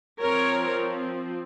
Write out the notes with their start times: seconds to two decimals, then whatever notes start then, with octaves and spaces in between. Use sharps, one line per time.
0.21 F3 C4 A#4 C#5